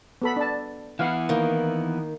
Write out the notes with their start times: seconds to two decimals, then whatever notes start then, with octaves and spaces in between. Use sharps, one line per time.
0.22 B3 A4 B5
0.36 D4 A5
0.99 E3 B3 E4 F5 F#5
1.29 D#3 A#3